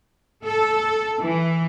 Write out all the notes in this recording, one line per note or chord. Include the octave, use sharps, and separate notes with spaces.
A4
E3